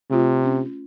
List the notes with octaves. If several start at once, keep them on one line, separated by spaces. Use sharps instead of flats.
C3 A3 F4
C#4